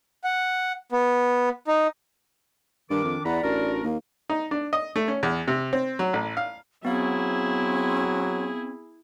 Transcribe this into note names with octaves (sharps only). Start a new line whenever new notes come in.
F#5
B3
D#4
G2 D#3 D4 A#4 D6
F2
E2 D5 F#5 A#5 B5
A1 D4 F#4 A#4
D#2 A#3
D#4
D4
D#5
A3
C#4
E2
C3
C4
F#3
A1
F5
F#3 B3 C4 E4 G#4 F5